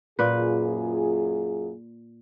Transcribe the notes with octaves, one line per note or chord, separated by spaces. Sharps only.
F#2 A#2 F4 G#4 B4